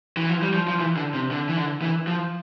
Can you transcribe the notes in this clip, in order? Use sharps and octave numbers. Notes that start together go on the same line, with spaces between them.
E3
F3
G3
F3
F3
E3
D3
C3
D3
E3
D3
E3
F3